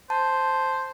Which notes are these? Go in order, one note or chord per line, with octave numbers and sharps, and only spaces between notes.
C5 A5